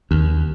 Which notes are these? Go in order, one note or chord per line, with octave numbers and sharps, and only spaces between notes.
D#2